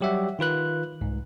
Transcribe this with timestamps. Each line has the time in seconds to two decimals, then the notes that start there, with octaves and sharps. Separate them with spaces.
0.01 F#3 G3 G4 C#5 E5 F#5
0.39 D#3 F4 B4 F#6
1.01 C2 G#2